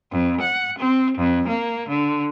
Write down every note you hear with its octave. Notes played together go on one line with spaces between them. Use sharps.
F2
F#5
C4
F2
A#3
D3